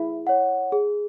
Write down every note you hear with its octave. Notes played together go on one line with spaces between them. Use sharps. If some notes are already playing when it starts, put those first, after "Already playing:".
Already playing: E4 G#4
C#5 F#5
G#4